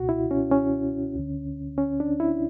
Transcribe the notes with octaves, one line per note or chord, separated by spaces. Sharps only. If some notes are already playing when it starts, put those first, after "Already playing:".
Already playing: C#2 B2 F#4
E4
C#4
C#4
D2 D3
C#4
D4
E4